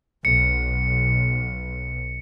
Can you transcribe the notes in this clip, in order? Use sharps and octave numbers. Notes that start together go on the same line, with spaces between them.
B1 C#7